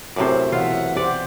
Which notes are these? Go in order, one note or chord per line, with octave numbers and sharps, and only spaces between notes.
F#2 A2 C3 C5 D5
B2 E3 F4 E5 F#5
G4 C5 D5